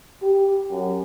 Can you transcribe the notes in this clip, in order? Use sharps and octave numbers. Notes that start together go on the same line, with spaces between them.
G4
F#2